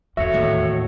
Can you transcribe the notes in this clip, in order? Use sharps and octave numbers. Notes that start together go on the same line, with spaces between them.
E2 F#4 A4 C#5 E5
D#2 A2